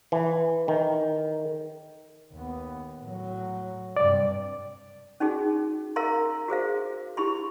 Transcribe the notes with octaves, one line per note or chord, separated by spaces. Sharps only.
E3
D#3
D#2 B3
A2 F#3
G2 C3 D5
C#4 D#4 F#4 G#4
A#4 F5 A#5 C6
F#4 G#4 C5 F5
E4 G4 B5 C6